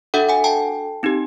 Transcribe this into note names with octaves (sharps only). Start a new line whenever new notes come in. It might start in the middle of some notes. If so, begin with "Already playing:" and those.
D4 F#4 A4 E5 F#5
F#5 G#5
G5 A5
C4 D#4 G4